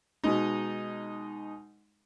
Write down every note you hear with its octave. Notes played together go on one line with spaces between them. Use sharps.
B2 G#3 D#4